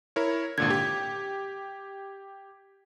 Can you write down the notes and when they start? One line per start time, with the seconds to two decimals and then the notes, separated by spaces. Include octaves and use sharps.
0.16 E4 A#4 C#5
0.58 G#1 A#2 D3 G#6
0.70 G4